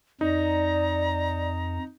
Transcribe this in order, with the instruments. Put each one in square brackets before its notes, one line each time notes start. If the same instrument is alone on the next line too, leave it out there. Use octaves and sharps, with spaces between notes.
[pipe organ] F2 [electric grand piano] D#4 [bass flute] D5 [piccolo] A#5